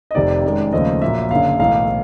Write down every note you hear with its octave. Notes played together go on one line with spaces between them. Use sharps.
D#5
F1 F2 C3 D#3 D5
F#2 D#3 G#3
D#2 C#3 F3 A3 D#5
A#1 A#2 F#3 A#3 E5
F#1 F#2 D3 F5
B1 A2 E3 A3 F5